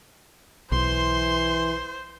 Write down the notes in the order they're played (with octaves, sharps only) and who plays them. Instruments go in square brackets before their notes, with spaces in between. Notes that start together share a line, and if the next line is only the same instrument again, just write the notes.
[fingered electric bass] B1 [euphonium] E3 [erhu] C5 [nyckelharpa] C6